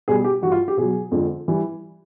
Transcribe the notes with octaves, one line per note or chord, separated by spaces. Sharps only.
B2 G3 G#4
G4
G2 E3 G3 F#4
F4
G4
B2 F#3 G#4
F2 D3 F3 G#3
E3 G3